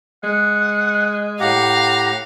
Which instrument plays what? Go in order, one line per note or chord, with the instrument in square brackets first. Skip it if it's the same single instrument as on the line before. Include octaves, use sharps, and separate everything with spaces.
[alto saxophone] G#3 [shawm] F#5
[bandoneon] A2 G4 F#5 [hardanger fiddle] F5 [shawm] A#5